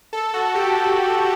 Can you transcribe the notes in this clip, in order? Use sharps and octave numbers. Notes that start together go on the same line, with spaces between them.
A4
F#4
G4